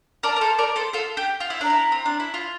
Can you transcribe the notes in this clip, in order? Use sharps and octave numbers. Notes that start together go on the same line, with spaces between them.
A#4 D5 A5
A#4
A4 C5
A#4 D5
A4 C5
F4 A4
G4
F4
E4
D4 A#5
E4
C4
D4
E4
F4